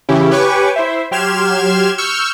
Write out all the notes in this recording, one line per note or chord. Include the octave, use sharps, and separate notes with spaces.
C#3 E3 C#4 E4 G4
G4 B4 C#5 G#5 C#6 D6
E4 C5 E5
F#3 G4 C6 F6 G#6 E7
C#6 E6 F6 G6